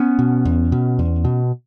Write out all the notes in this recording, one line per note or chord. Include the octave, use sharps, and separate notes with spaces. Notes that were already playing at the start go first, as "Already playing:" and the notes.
Already playing: B3 C#4
B2
E2
B2
E2
B2